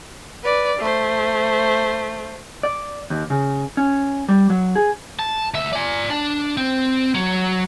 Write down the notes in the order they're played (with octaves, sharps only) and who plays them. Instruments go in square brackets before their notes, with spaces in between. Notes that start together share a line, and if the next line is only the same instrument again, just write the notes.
[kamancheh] B4 D5
A3 C5
[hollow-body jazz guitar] D5
D#2
C#3
C#4
G3
F#3
G#4
[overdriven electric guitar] A5
D2 E5
D5 G#5
D4
C4
F#3